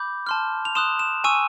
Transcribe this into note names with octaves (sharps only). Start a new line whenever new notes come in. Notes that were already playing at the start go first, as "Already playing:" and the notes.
Already playing: B5 D6 G6
A5 C6 F6
F7
C6 D#6 F#6 E7
E7
G#5 C#6 E6 D#7